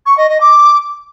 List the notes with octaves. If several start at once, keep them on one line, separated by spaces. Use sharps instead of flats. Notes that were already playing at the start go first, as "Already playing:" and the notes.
C#6
D#5
D#5
D6